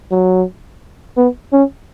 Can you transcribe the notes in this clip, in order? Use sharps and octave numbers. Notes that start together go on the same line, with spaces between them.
F#3
B3
C#4